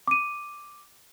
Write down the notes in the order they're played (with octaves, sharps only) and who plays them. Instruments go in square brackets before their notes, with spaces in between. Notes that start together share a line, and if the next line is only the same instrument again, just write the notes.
[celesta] D6 D#7